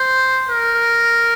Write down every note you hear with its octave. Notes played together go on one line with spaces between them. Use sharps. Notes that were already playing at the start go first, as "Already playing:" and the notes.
Already playing: C5
A#4